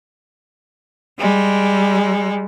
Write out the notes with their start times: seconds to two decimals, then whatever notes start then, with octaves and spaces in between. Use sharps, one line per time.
1.18 G3 G#3